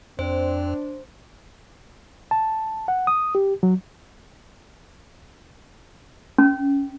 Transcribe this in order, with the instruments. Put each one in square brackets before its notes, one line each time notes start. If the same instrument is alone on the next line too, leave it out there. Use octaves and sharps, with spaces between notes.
[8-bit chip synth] F2 [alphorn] C4 [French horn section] D4 [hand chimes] C5
[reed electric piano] A5
F#5
D#6
G4
F#3
[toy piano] C#4